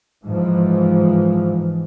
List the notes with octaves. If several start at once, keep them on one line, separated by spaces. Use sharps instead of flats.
G#2 E3 F3